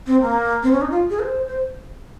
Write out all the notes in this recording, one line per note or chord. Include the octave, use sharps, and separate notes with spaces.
C4
A#3
C4
C#4
D#4
F4
G#4
C5
C5